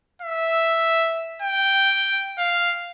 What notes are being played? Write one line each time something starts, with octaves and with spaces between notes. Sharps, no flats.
E5
G5
F5